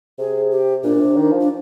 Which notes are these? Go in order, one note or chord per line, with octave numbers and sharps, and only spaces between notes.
C3 G#4
G4
A#2 D4
A#2
C3
D#3
F3
D4